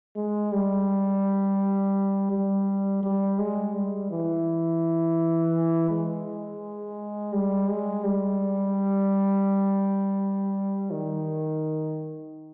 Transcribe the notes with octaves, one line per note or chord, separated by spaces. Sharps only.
G#3
G3
G3
G3
G#3
G3
E3
G#3
G3
G#3
G3
D#3